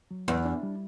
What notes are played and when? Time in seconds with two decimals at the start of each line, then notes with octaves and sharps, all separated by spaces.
0.11 F#3
0.28 E2 B3
0.45 D4
0.63 G3